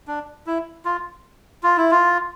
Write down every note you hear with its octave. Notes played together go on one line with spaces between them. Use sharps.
D4
E4
F4
F4
E4
F4